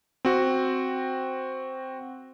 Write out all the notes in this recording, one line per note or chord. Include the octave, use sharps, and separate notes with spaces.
C4 F#4